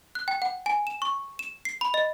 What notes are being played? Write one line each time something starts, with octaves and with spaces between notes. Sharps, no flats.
F#6
G5
F#5
G#5
E7
C#6
E7
C7
B5
D#5